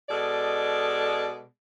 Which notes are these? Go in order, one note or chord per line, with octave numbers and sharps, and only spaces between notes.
B2 G#3 A4 D5